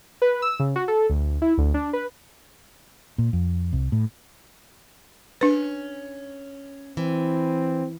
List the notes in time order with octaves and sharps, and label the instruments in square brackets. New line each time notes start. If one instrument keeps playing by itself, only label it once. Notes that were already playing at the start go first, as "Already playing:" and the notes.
[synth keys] B4
E6
C#3
F#4
A4
D2
E4
D2
D4
B4
[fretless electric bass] A#2
F2
C2
A2
[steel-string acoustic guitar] C#4 [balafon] D4 B4
[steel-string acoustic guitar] E3 [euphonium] C4